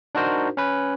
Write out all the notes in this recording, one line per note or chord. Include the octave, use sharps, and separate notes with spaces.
D4 D#4 F#4 A#4 C5
C#4 B4